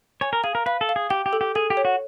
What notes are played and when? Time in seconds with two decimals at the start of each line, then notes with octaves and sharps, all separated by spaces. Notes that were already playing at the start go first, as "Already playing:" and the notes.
0.21 C#5 G#5
0.33 A#4
0.44 G#4 F5
0.55 A#4
0.66 B4 F5
0.81 A4
0.89 F5
0.96 G#4
1.10 G4 G5
1.26 G4
1.33 A4
1.41 G4
1.55 G#4 A4
1.70 G4
1.77 C#5
1.85 F#4